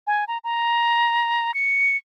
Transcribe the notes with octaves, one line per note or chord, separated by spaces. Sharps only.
G#5
A#5
A#5
C#7